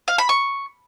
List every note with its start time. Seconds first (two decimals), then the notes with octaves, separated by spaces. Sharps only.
0.08 F5
0.18 B5
0.29 C#6